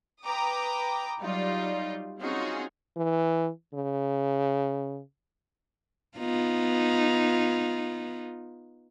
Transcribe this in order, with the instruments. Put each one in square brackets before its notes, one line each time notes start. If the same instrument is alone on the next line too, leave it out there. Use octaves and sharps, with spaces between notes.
[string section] B4 G5 A#5 D6 D#6
F#3 G3 D#4 F4 D5
C4 C#4 D#4 F4 F#4 G#4
[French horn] E3
C#3
[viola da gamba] B3 D#4 F4